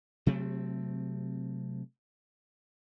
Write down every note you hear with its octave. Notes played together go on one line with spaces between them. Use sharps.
C3 F#3 A3 C4